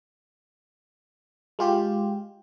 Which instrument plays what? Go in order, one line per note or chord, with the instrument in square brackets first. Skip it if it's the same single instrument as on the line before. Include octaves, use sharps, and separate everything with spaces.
[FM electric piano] G#3 F4 G4